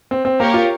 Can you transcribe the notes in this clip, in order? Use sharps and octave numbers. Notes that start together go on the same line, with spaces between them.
C4
C4
A#3 G4 A#4 C#5
F4